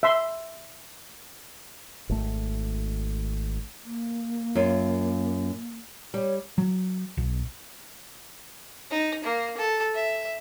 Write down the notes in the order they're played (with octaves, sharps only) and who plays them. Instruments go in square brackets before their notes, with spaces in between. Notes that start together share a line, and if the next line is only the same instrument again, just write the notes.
[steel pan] E5 C6
[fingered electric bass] G#1 A3
[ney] A#3
[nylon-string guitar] F#2 F4
[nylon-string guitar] G3 [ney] C#5
[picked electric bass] F#3
B1
[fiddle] D#4
A#3
A4
E5